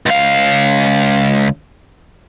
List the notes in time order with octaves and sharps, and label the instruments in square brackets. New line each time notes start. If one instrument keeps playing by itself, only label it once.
[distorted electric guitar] C#2 F5